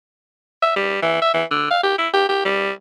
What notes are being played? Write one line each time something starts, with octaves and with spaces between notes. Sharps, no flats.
E5
G3
E3
E5
E3
D3
F5
G4
E4
G4
G4
G3